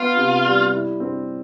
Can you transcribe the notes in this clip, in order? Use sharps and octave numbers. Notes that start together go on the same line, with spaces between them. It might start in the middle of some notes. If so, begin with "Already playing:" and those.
Already playing: B3 F4
C3
G3
E4
C4